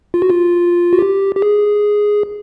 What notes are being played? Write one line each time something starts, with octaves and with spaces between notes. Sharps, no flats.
F4
F#4
F4
F#4
G4
G4
G#4